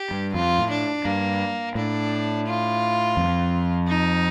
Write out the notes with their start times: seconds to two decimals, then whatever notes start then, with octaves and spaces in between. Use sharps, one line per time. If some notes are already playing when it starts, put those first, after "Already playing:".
Already playing: G4
0.11 G2
0.34 F2 F4
0.58 A2
0.70 D4
1.05 G2 A#3
1.75 A2 D4
2.47 F4
3.17 F2
3.87 D#4